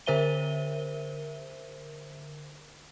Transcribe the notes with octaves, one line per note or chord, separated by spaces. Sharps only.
D3 A#4 C5 E5 D#7 G7